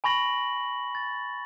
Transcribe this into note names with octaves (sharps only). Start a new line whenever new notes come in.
G#5 B5 C#6 A#6 F#7
A6